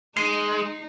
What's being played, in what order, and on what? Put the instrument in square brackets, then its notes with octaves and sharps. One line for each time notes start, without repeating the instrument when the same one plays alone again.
[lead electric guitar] G#3 [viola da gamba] D#4 [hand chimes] C7